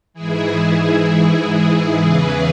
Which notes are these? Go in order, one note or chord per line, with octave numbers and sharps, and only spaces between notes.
G#2 E3 E4 G#4
E2 C#3 E3 G#4 B4